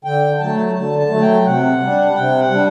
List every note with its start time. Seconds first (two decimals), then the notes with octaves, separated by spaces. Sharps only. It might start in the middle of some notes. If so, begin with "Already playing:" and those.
0.04 D3 G5
0.40 F#3 A3 A5
0.75 D3 A5
0.99 A5
1.10 F#3 A3
1.22 G5
1.46 C3 F#5
1.81 G3 D4
2.16 C3 G5
2.39 F#5
2.51 G3 D4